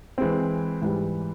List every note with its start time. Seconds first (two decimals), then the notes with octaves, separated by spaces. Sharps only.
0.18 E3 G#3 C4
0.82 G#2 E3 G3